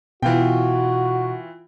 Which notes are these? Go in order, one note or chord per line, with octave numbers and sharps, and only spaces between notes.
B2 E3 F4 F#4 G5